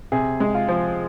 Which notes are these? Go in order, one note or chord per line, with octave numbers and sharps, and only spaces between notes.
C3 G#4
G#3
F4
F3